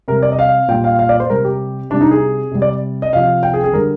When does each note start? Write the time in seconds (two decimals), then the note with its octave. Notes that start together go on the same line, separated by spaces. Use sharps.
0.08 C3 G3 A#4
0.23 D5
0.32 D#5
0.39 F5
0.68 A#2 G3 G5
0.84 F5
0.99 F5
1.09 D5
1.20 C5
1.30 C3 G3 A#4
1.44 G4
1.90 C3 G3 D4
2.01 D#4
2.11 G#4
2.51 C3 G3
2.62 D5
3.02 D#5
3.13 C3 F3 F5
3.43 G5
3.53 G#4
3.64 G#4
3.73 D3 G3 A#4